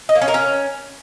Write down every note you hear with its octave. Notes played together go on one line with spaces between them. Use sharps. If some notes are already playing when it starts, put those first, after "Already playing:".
D#5
A#3
C#4
A#4
C#4